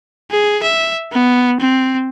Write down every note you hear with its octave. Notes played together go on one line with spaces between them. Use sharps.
G#4
E5
B3
C4